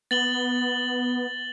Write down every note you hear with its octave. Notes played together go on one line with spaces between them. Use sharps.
B3 A6 F#7 G7